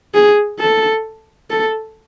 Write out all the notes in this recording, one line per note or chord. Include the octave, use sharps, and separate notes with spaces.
G#4
A4
A4